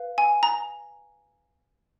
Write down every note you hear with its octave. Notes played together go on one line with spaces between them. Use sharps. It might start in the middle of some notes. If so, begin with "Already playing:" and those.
Already playing: B4 F5
G#5
A#5